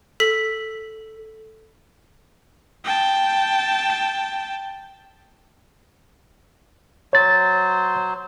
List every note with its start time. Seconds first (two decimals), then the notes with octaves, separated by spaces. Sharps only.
0.20 A4 B6
2.84 G5 A5
7.13 F#3 C5 C#5 A6